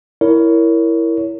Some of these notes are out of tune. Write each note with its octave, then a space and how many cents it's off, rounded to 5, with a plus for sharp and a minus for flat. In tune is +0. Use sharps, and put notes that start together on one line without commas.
E4 +0 A#4 +0 C#5 +20